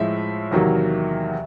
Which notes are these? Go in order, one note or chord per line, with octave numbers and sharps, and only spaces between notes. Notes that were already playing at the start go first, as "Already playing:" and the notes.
Already playing: A2 F3 G#3 E5
E2 C3 D#3 F#3 A#3